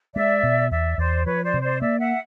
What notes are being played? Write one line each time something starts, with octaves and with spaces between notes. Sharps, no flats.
G#3 D5 E5
B2
E2 D5 E5
E2 C5 D5
F3 B4 C#5
C5 D5
C3
C5 D5
A#3 D5 E5
E5 F#5